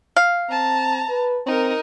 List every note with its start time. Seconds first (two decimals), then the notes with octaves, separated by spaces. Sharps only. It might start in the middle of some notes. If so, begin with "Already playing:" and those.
0.16 F5
0.50 C4 A5 A#5
1.09 B4
1.46 C4 D#4 A#4